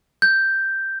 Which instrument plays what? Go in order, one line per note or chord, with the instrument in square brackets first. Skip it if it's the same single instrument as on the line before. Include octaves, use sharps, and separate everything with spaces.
[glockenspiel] G6